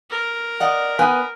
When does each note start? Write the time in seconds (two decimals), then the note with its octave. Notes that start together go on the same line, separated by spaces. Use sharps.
0.11 A#4
0.60 D5 D#5 F#5
0.99 B3 B4 G#5